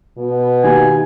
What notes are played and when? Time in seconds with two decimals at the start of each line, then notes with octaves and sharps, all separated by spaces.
0.18 B2
0.63 D#2 G#5